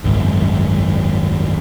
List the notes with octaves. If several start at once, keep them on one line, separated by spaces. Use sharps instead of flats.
G#1 C#2 F#2